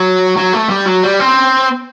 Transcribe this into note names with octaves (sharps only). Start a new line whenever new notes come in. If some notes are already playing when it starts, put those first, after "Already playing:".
Already playing: F#3
F#3
A3
G3
F#3
G3
C4